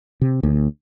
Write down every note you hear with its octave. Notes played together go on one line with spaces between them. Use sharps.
C3
D2